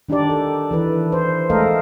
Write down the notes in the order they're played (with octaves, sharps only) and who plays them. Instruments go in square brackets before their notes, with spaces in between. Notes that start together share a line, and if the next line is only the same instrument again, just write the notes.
[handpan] D#3 D4 D#4 G4 D5
A4
E3 A4 B4
C5
G#3 A3 A4 A#4 D#5 F5